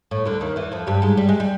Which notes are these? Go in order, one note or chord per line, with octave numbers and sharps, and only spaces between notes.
A2
D2 D3
D#2 D#3
E2 E3
F2 F3
G2 G3
G#2 G#3
G3
G#3
G3